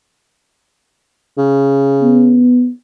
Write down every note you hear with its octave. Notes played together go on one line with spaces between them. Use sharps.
C#3
B3